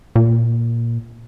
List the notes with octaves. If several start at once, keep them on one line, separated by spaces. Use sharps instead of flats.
A#2